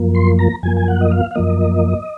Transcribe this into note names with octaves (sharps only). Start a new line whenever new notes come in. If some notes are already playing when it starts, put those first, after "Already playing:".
Already playing: F#2 F3 A#3
C6
A#5
F#2 F3 A#3 G#5
G#5
F#5
D#5
F5
F5
F#2 F3 A#3 D#5